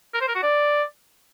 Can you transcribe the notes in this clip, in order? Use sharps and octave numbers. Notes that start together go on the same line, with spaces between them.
A#4
C5
A#4
F#4
D5